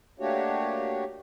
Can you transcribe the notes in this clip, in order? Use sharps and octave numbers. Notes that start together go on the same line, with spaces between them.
A3 A#3 D4 F#4 G4 C#5